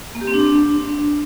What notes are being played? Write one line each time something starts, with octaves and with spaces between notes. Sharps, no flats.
A#3
G4
C4
D4